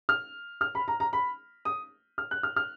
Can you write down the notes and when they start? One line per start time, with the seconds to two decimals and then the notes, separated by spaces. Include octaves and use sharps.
0.09 F6
0.61 F6
0.75 B5
0.88 A#5
1.00 A#5
1.13 B5
1.65 D#6
2.18 F6
2.31 F#6
2.43 F6
2.56 F6